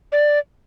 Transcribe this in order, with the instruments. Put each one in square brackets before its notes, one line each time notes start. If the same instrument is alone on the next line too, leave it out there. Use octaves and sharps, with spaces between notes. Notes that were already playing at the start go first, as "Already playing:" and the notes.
[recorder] D5